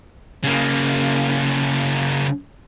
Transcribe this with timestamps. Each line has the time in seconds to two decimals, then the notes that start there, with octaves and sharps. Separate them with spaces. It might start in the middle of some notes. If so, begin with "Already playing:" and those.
0.44 C#3 A#3